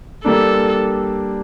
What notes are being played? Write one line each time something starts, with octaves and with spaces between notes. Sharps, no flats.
G3 A#3 D4 A4